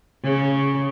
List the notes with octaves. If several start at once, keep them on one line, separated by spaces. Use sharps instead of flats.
C#3